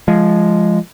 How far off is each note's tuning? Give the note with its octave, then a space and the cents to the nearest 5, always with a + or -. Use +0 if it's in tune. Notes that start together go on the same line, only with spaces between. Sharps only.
F3 -10 G#3 +0